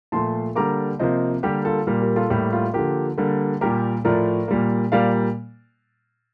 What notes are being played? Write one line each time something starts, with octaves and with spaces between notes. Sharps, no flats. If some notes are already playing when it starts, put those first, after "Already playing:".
A#2 F3 A3 A5 C6
D3 G3 A#3 A#5 D6
C3 F3 A#3 C5 D#5
D3 G3 A#3 G4 A#4
F4 A4
A#2 G3 A#3
G4 A#4
F4 A4
A2 G3 A#3 G4
F4
D3 F3 A#3 G4
D3 G3 A#3
A#2 G3 A#3 G4 A#4
A2 F3 A3 A#4 D5
A#2 G3 A#3
A#2 G3 A#3 D5 F5